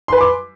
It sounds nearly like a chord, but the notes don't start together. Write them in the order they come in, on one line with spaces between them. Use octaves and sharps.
C6 B4 G#5 D6